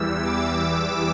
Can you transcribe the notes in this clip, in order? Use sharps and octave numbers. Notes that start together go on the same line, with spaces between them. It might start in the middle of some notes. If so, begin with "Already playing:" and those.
Already playing: E2 E3 G3 E6
D6